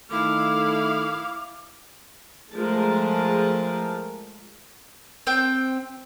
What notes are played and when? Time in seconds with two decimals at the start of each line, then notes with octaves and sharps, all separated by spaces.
0.11 D#3 A3 E4 F5 D6
2.53 F3 G#3 A3 A#4 A5
5.27 C4 G5